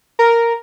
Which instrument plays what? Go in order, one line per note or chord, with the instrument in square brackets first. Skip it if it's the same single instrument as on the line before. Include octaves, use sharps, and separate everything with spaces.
[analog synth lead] A#4